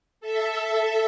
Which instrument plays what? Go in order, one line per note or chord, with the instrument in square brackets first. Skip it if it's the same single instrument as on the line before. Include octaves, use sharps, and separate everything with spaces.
[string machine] A4 E5